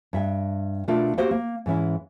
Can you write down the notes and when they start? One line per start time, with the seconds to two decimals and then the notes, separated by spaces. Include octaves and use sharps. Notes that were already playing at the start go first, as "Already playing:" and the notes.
0.13 G2 E5 G5
0.88 B2 A3 D4 F4 A#4
1.18 A#3 B3 F#4 G4 C5 F5
1.31 A#3
1.66 G#2 E3 C#4 E4